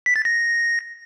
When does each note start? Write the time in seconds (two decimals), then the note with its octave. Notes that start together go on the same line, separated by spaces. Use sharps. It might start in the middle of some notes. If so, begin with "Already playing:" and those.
0.06 B6
0.16 A6
0.25 A#6